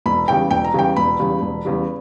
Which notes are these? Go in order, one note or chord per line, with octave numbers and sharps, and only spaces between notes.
E1 B5
E2 C#3 G3 G5
E1 G5
A#5
E2 C#3 G3 G5
E1 B5
E2 C#3 G3
E1
E2 C#3 G3